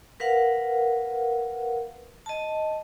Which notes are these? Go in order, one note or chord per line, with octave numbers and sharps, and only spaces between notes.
A#4 B4 F5 F#5
D#5 A5